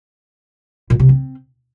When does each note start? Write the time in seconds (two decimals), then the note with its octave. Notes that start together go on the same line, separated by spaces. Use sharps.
0.90 A#2
0.99 C3
1.09 C4